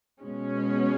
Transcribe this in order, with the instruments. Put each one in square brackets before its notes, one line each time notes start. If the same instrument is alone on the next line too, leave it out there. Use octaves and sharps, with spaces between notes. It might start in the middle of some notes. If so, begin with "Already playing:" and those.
[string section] B2 G#3 C#4